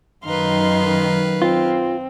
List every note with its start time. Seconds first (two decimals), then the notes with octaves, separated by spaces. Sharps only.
0.25 F#2 D#3 D#4 B4 F5 C6
1.42 C4 F4